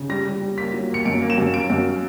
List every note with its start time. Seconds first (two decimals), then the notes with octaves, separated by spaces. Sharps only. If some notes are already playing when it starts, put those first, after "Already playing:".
Already playing: C#3
0.09 G3 A#6
0.26 G3
0.42 G3
0.58 A#3 B6
0.73 F#3
0.90 A#3 C#7
1.05 F#2 D7
1.22 A#3
1.30 E7
1.38 F#2
1.54 A#3 D7
1.70 F#2